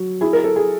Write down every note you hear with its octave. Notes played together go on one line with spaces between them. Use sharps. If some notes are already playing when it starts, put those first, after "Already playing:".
Already playing: F#3
E4 G#4
A#4
A4
G#4